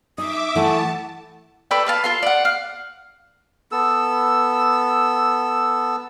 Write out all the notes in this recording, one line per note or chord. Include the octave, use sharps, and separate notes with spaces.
D#4 E5 D6 D#6
E3 A3 E4 F#5 A5
A4 B4 D5 G5
B4 F5 A5
F4 A4 C6
D5 F#5
F5
B3 A4 E6